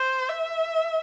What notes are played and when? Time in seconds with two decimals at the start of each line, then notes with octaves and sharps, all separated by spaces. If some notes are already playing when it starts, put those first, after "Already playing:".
Already playing: C5
0.29 E5